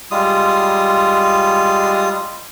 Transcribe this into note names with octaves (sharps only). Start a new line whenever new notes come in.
G3 G#3 F4 D#6